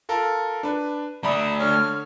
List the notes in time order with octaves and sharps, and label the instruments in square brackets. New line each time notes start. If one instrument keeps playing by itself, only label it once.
[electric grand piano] F4 A4 A#4
D4 B4
[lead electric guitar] A3 D5 [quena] E5 [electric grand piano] A#5 B5 D#6
[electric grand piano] D3 C#5 [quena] F6